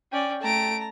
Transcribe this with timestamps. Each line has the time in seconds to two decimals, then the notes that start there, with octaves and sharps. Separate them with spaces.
0.12 C#4 D5 G5
0.42 A3 A5 A#5 D7